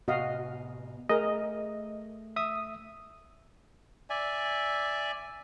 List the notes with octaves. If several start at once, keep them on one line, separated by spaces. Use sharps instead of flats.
A2 C3 B3 F#4 D#5 F5
A3 G#4 A#4 D#5
E5 D#6
D5 E5 G#5